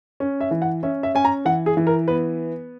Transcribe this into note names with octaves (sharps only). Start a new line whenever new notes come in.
C#4
E5
E3
F#5
C#4 E5
E5
C#4 G#5
A#5
E3 F#5
G#4
E3
A#4
B3 B4